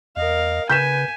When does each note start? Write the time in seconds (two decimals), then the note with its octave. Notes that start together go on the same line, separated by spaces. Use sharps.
0.16 E2 A#4 D#5 F5
0.69 C#3 B4 G#5 G6 B6 E7